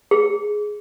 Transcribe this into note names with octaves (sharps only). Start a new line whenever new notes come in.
G#4